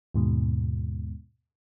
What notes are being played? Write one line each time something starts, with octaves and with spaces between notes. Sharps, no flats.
D#2 G#2 B2